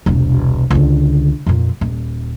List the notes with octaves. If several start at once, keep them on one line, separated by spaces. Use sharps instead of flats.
E1 C2
C#2 D3
F2 A#2
D#1